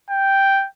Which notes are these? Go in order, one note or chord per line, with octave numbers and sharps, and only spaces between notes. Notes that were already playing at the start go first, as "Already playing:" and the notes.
G5